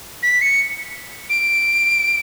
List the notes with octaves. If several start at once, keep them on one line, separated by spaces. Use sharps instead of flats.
B6
C#7
D7